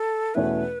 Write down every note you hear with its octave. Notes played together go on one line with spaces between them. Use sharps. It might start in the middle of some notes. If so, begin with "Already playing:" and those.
Already playing: A4
E2 B2 A3 C#4 E4 B4